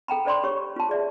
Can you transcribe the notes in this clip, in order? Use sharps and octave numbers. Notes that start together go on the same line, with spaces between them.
A4 G5 A#5 B5
A4 C5 D5 B5 C6
G4 C#5 C#6
F4 A5
G#4 D5 E5